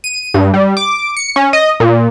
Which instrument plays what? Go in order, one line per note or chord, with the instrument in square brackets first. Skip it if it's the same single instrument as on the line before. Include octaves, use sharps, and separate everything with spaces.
[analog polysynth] D#7
G2
G3
D6
C#7
C#4
D#5
A#2